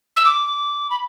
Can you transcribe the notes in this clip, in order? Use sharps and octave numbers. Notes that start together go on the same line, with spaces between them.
E6
D6
B5